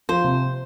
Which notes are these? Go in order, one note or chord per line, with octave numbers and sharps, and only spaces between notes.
F3 C5
C3